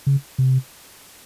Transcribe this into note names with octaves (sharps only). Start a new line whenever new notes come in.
C#3
C3